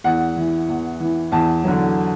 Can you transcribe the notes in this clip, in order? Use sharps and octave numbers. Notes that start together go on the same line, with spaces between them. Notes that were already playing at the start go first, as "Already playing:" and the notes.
E2 F#5
E3
E2
E3
E2 A5
D3 F#3